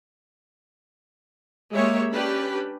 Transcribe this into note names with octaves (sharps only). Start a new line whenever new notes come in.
G#3 A#3 G4 C#5 E5
C#4 D4 G4 B4 B5